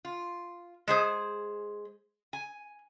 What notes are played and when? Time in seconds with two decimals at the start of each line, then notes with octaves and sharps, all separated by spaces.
0.05 F4
0.87 G#3 G#4 C5
2.33 G#5